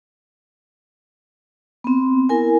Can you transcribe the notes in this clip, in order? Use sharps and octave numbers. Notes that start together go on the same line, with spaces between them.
B3 C4
E4 A#4 G#5